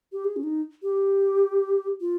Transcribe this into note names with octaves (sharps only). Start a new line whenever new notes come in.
G4
G#4
C#4
D#4
G4
F4